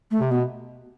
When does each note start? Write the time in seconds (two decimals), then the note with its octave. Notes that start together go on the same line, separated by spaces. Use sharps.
0.11 A3
0.20 C3
0.30 B2 B3